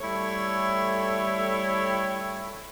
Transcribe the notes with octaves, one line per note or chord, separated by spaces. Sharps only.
G3 A3 E4 A4 C#5